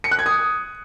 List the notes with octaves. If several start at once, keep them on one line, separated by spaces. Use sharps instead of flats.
C#7
F#6
G#6
D#6